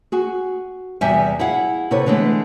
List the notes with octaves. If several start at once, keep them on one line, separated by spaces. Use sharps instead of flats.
F#4 G#4
E2 C3 G3 G4 E5 G#5
E4 G#4 F5 F#5
C3 A4 B4 C#5
D3 E3 G#3 A3 B3